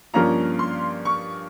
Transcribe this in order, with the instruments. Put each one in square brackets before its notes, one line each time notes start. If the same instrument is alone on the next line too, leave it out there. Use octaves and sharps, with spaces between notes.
[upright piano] G2 F3 A#3 C#4 F4 A#5
C6
C#6